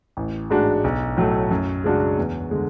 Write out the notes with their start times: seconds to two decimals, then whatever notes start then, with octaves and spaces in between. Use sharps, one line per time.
0.17 A1
0.50 G#2 G#3 D4 F#4
0.84 B1
1.17 A2 F#3 A3
1.51 F#2
1.84 C#3 G#3 D4 F#4
2.17 E2
2.51 D3 G#3